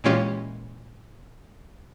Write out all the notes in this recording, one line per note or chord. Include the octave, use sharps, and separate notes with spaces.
A#2 E3 G#3 C#4 F4 G4